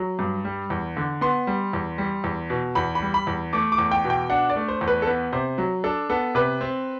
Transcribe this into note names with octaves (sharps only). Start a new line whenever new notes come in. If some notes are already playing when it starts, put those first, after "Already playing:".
Already playing: F#3
G2
G3
E2
D3
B3 C6
G3
E2
G3
E2
B2
E2 B5
B5
G3
B5
E2
A3 D6
D6
E2
G5
B2
G5
D4 F#5
D5
A3
C5
E2
B4
A4
B3 B4
C3 C5
F#3
D4 A4
B3 A4
C3 B4
C4